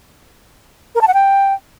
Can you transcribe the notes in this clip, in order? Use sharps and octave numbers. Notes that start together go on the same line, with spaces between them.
A#4
A5
F#5
G5